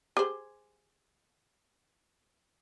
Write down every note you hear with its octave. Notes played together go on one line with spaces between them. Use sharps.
G4 G#4 C5